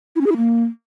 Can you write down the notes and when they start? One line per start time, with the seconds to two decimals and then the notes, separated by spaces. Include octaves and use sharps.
0.16 E4
0.21 C#4
0.26 G#4
0.31 E4
0.37 A#3